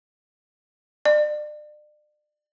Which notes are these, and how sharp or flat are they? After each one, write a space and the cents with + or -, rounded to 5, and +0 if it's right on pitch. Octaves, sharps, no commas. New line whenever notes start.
D5 +35